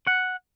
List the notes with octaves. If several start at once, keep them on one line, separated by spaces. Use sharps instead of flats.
F#5